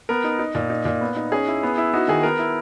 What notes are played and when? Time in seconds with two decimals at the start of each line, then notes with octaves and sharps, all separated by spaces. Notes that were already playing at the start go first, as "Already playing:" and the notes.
0.09 B3 A#4
0.24 D#4
0.39 D#4
0.55 A#2
0.70 D#4
0.85 A#2
1.01 B3
1.16 D#4
1.32 C#4 G#4
1.48 E4
1.63 B3
1.78 E4
1.94 D#4 F#4
2.08 D#3 G#4
2.23 B3 A#4
2.39 E4